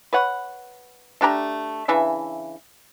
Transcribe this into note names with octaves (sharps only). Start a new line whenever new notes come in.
B4 C#5 F#5
A3 D4 G4 A#5
C#3 E3 D4 E5